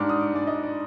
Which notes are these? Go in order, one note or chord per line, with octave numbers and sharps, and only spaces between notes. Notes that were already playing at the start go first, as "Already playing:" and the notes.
Already playing: G#2 G3 D4 D6 F6
D#6
D6
G#2 D5
D#5
D5